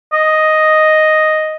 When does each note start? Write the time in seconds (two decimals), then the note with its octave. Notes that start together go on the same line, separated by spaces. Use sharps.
0.13 D#5